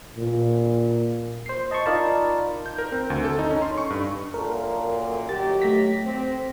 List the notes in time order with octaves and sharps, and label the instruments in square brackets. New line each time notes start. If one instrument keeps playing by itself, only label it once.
[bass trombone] A#2
[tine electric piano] C5 C7
D#5 A5 C6 C#6
D#4 F4 A#4 D5 A5 B5
[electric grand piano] G6
A#4
C4
D2
A4
D#4
C#4
C6
C#6
G2
[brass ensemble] F#2 A#2 [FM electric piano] A4 A#4
[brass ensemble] D#3 F#3 G4 [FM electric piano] A6
[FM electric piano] A3 A#6 B6
[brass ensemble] C4